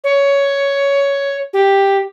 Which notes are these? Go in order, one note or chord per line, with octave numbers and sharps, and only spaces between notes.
C#5
G4